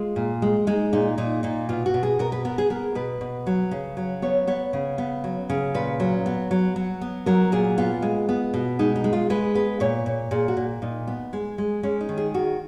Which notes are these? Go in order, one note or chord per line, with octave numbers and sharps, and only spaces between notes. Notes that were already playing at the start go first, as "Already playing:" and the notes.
Already playing: G#3 F4
A#2
G#3
G#3 D#4
A#2 D#4
A#2 D#4
A#2 D#4
B2 F4
F#4
B2
G#4
B2 A#4
B4
B3 A#4
G#4
B3 A#4
B2 B4
B2
F#3
C#3
F#3
B3 C#5
B3 C#5
C#3
B3
F#3
C#3
A#2 B4
F#3
B3
F#3
F#3
B3
F#3 A#4
A#2 G#4
B3 F4
G#3
B3
B2
G#3 D#4
D#4
G#3
F4
G#3 B4
B3 B4
A#2 C#5
A#2
A#2 G#4
F#4
A#2
A#2 D#4
B3
G#3
G#3
G#3 C#4
D#4
D#3
G#4
D#3 F#4